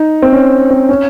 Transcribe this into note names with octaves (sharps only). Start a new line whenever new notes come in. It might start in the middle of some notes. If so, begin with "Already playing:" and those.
Already playing: D#4
C4
C#4
C4
C#4